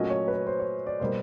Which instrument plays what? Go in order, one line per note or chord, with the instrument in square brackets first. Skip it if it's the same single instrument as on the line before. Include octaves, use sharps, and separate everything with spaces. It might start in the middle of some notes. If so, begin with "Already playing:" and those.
Already playing: [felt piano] A#2 F#3 A3 C#4 F#4 [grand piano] D#5
[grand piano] C#5
B4
C5
C#5
D5
[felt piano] B2 G3 A#3 [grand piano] C5